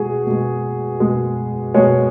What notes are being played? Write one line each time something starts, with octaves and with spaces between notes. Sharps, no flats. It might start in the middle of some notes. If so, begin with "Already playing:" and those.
Already playing: B2 G#3 F#4 G#4
B2 G#3
B2 G#3
B2 G#3 C#5